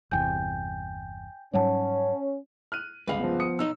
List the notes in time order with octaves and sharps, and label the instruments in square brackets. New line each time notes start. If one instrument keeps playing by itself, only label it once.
[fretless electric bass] G1 E2 C3 [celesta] G5 G#5 G6
[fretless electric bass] G#2 F#3 G3 [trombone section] C#4 [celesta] C#5 F#5 A5
[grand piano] F6 F#6 D#7
[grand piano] G1 C#2 F5 [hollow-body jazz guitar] G#4 B4
[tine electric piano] F3 B3
[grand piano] D#6 C#7
[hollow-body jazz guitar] B1 D#4 D#5 [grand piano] E6